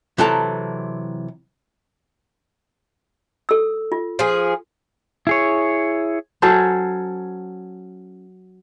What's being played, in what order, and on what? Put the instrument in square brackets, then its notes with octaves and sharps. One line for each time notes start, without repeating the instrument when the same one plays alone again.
[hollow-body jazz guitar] C3 E3 F#3 A4 A5 A#5
[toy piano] A4 E6
F4
[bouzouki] F3 G#4
[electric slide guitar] E4 G#4 C#5
[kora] F#3 C#4 A4 C5